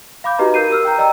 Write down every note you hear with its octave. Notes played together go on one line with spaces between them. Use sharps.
F5 B5 D6 G6
D#4 F#4 G4 B4 D#5 A#5
A#4 G6 C7 D#7
A#4 E6 F6
G5 A#5
D5 D#5 G5 A#5 E6